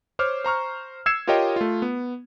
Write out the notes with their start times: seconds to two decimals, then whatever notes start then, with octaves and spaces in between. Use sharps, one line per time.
0.19 C5 C#5 D6 F6
0.44 C5 A#5 C#6 F6
1.06 E6 G#6 C7 C#7 E7
1.27 F4 G4 A#4 C#5 D#5 G5
1.56 A3 F4
1.82 B3